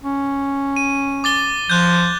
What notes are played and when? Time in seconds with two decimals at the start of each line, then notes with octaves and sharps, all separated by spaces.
0.04 C#4
0.76 D#7
1.24 D6 A6 G7
1.70 F3 F#6 G6